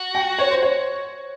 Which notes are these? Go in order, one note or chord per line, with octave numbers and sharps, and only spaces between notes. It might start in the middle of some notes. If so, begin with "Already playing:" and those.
Already playing: F#4
G5
C#5
C5
C#5